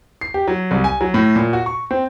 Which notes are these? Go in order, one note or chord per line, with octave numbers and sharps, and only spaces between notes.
C7
G4
F#3
C2
G#5
F#3
A2
A#2
F#4
C#6
C4